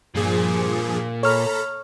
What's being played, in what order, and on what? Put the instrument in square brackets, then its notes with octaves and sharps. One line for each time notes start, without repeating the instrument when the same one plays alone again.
[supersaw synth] G2 F3 G#4 [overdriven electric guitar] A#2
[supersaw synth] A4 A#5 B5 [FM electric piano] C#5 F6